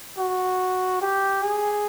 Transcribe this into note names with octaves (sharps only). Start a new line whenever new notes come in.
F#4
G4
G#4